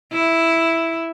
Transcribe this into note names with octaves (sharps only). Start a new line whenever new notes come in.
E4